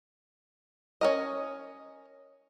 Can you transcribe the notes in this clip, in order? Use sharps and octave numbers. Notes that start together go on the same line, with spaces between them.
C#4 A#4 D#5